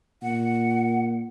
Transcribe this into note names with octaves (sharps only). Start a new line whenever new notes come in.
A#2 F#5